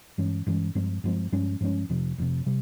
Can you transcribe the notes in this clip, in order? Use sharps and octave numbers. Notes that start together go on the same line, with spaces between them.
G2 E3 G#3 C#4
G2 E3 G#3 C#4
G2 F3 G#3 C4
G2 F3 G#3 C4
G2 F3 G#3 C#4
G2 F3 G#3 C#4
F1 F2 C3
F1 F2 C3
C3 G3